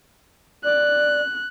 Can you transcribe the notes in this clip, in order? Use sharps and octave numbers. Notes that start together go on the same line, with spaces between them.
D5 F#6